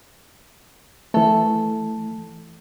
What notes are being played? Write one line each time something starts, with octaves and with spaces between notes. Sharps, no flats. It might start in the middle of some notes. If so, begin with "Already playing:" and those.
E3 A3 A4